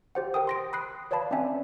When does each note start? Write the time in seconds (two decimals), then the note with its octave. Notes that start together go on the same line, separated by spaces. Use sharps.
0.15 G4 C5 F#5
0.34 A#4 G5 D#6
0.47 C6 A#6 D7
0.73 B5 D#6 F#6 C7
1.11 B4 C#5 D5 F5 A5 B5
1.31 C4 C#4 D5 E5 G#5